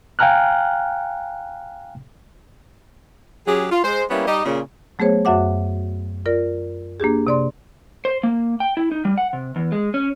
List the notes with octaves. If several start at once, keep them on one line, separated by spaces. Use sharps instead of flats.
F5 G5 G#5 A#5 F6 F#6
F#3 C#4 G4 G#4
F4
G#3 C5
G3 A#3 B3 C#4 E4
G3 D#4 G4 D#5
A#2 C#3
F#3 A3 B3 G#4 C5 C#5
F#2 F#4 E5 F#5 D6
F4 A#4 D5
A#3 D4 G4 G#4
C3 D5 C6
C5
A#3
G5
E4
D#4
G3
F#5
C3
E2
G#3
C#4